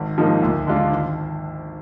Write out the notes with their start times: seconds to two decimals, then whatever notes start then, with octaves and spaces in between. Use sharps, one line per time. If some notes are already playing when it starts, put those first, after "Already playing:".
Already playing: G#1
0.18 G#2 F3 A#3 D#4
0.42 D2
0.67 D3 G#3 D4 F4
0.91 G#1